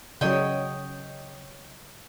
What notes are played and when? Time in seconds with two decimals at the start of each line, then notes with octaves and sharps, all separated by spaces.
0.21 C#3 F#3 C#5 D#5 G5